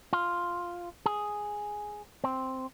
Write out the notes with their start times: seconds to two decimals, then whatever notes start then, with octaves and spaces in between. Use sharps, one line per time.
0.13 F4
1.06 G#4
2.24 C4